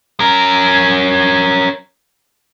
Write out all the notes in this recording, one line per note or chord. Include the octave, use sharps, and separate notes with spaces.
C#4 A#4